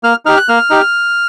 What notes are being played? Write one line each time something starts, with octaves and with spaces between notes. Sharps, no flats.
A#3 F6
D#4 G4 F6
F#6
A#3 F6
D#4 G4